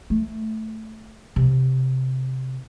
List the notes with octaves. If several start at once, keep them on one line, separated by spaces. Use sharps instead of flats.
A3
C3